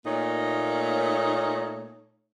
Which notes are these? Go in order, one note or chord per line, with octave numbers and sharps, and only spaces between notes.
A#2 A3 A#3 D#4 C#5